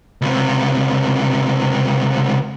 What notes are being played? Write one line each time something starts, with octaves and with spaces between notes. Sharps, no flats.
C#2 C3